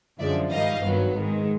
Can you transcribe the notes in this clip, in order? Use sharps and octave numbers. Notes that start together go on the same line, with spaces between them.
F#2 D3 F3 G#3 D5 E5
G#2 D#3 G3 D#5 F5
G#1 G2 D#3 F#3 B3
G#2 D#3 G#3